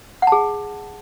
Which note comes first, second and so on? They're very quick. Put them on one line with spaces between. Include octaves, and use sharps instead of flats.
F#5 A5 G#4